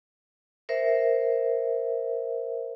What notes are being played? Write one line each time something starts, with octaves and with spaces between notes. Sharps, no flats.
A#4 C5 E5